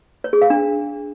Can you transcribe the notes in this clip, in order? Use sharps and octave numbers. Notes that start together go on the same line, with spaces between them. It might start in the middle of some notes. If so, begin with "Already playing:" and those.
C#5
G#4
F5
D4